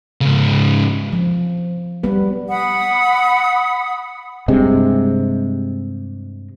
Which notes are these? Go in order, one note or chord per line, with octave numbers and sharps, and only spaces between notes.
G#2 C#3
F3
G3 B3 B4
F#5 B5 D#6
G2 C3 G#3